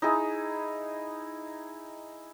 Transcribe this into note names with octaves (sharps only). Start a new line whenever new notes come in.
D#4 E4 G#4